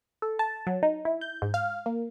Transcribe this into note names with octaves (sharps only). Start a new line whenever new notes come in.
A4
A5
F#3
D#4
E4
G6
G#2
F5
A#3